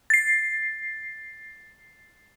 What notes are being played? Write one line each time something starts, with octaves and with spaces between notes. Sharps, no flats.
A6 C7